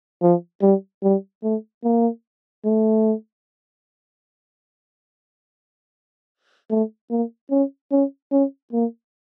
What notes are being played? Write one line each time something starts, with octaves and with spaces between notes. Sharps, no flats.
F3
G3
G3
A3
A#3
A3
A3
A#3
C#4
C#4
C#4
A#3